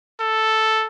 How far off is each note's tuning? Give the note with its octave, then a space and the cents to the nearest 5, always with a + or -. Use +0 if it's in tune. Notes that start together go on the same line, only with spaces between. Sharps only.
A4 +0